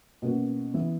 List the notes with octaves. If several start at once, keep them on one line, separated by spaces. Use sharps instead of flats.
B2 A#3 C#4 F#4
E3 B3 E4